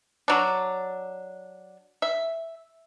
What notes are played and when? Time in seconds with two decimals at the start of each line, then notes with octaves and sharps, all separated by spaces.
0.28 F#3 D4
2.02 E5